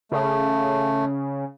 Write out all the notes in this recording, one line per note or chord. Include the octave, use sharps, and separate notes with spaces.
C#3 A3